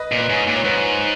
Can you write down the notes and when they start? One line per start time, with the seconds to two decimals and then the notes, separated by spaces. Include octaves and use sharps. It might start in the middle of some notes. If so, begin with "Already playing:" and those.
Already playing: B4 D#5
0.12 A#2
0.18 B4
0.29 G#2 C#5
0.47 A#2
0.56 C#5
0.65 G#2 B4